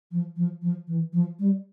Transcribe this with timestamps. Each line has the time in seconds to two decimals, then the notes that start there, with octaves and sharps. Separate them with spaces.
0.11 F3
0.36 F3
0.62 F3
0.87 E3
1.13 F3
1.39 G3